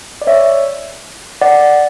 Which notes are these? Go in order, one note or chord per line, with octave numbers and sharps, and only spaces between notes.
D5
C#5 E5
D5 F#5